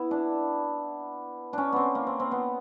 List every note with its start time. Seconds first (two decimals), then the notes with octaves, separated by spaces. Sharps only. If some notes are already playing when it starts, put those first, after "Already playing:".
Already playing: B3 E4
0.11 D4
1.53 C#4 D4
1.73 B3 C4
1.95 A#3
2.07 C4
2.20 C4
2.31 B3